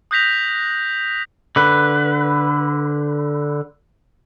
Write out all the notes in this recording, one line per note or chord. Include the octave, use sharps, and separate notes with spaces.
D#6 F#6 G6 A#6 B6 F7
D3 B4